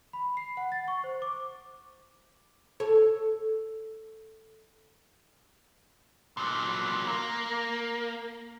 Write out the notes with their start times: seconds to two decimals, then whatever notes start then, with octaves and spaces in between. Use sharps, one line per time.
0.13 B5
0.37 C7
0.57 F#5
0.72 A6
0.88 C#6
1.04 C5
1.22 D6
2.80 A4 C#5
6.37 A#2 F#3
7.07 A#3